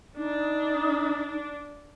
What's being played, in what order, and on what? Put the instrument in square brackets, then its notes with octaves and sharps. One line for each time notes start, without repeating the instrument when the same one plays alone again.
[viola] D4 [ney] D#4